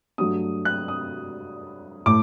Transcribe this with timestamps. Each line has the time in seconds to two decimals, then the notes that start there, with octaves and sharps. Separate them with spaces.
0.18 G2 F#3 A3 D#6
0.65 F#6
0.88 D#6
2.06 A2 A3 D6